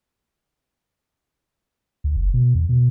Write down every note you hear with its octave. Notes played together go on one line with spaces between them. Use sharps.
D2
F#1
B2
E2
B2